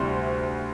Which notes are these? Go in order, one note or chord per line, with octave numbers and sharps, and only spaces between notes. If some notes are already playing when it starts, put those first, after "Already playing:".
Already playing: D2 C3 G3 C4 E4 C6